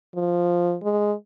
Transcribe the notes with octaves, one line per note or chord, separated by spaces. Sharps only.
F3
G#3